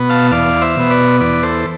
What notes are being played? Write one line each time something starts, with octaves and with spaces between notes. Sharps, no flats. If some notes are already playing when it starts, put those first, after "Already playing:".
Already playing: B2 B3
F5 A5
E2 D5 F5
C5 E5
B2 B3
B4 D5
E2 B4 D5
A4 C5